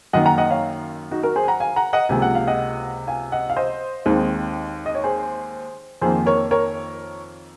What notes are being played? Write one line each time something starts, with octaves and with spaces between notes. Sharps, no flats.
F#2 D#3 A#3 D#5 F#5
F#5 A#5
D#5 F#5
C#5 F5
D#4 F#4
F#4 A#4
G#4 C5
G#5
F#5 A#5
F5 G#5
F#5 A#5
D#5 F#5
C#2 C3 F3 A#3 G#5
F#5
F5
D#5 F#5
F5 G#5
D#5 F#5
F5
C5 D#5
D#2 D#3 G#3 C4
D#5
C#5
G#4 C5
F2 D#3 A#3 G#4 C5
A#4 C#5
A#4 C#5